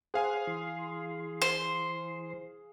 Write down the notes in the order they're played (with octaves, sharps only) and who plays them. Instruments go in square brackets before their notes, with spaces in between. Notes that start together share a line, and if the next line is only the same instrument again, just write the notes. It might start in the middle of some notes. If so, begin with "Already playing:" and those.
[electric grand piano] G#4 F5 G#5 [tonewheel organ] C5 F#5
[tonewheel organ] E3 C6
[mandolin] C5